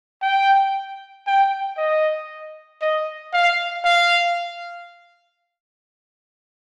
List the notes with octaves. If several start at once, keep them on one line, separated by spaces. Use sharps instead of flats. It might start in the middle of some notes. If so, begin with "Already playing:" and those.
G5
G5
D#5
D#5
F5
F5